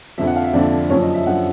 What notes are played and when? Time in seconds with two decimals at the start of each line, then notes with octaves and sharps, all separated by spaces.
0.18 F2 D3 F3 E5
0.27 F#5
0.36 F5
0.44 E5
0.53 F2 D3 F3 D5
0.90 F#2 D3 F3 C#5
1.02 D#5
1.14 E5
1.27 F#2 D3 F3 F#5